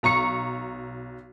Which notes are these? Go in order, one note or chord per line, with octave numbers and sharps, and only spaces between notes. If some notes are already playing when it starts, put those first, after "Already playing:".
B1 A#5 C#6 C#7